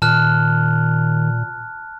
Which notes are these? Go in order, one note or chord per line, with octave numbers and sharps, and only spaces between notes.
A#2 D#3 A5 F6 F#6